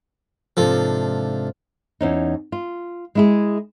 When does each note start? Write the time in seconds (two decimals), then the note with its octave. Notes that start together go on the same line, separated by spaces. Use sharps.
0.57 G#2 C3 F3 D4 A4
2.01 E2 C#4 D#4
2.52 F4
3.15 G#3 E4 G#4